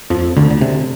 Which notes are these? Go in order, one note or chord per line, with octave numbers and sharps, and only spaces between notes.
F2 F3
D2 D3
D3
C3